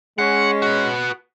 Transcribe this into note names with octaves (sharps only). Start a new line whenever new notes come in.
G#3 C#4 F#5
F#4 B4